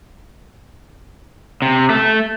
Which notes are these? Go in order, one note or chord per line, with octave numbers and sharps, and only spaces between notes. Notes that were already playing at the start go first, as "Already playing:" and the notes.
C3
A3